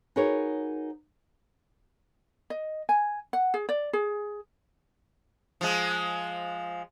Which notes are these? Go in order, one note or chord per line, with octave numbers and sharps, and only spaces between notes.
D#4 F#4 G#4 A#4 B4 C#5
D#5
G#5
F#5
G#4
D5
G#4
F3 G#3